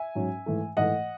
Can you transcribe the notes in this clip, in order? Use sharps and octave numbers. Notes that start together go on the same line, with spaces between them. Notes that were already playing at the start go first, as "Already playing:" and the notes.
Already playing: E5 G#5
G#2 F#3 C#4
G#2 E3 A3
G#2 E3 A3 D#5 F#5